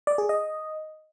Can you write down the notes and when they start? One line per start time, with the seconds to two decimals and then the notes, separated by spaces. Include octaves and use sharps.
0.07 D5
0.18 G#4
0.29 D#5